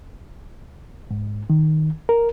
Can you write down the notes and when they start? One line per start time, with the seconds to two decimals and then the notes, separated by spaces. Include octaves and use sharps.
1.11 G#2
1.50 D#3
2.09 A#4